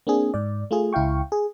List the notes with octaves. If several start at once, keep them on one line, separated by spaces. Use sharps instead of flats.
A#3 C4 D4 G#4
G#2 D5
A3 F4 G#4
C#2 E4 F5 G5 C#6
G#4